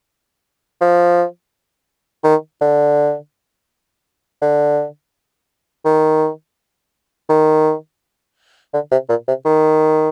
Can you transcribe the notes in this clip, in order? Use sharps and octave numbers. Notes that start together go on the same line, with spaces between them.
F3
D#3
D3
D3
D#3
D#3
D3
C3
A#2
C3
D#3